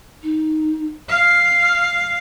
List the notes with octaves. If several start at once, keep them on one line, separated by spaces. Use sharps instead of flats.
D#4
F5 F6